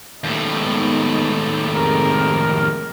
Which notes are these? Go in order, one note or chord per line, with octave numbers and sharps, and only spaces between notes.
D#2 A2 G#3 B3 D#4
F2 G#2 C3 A#4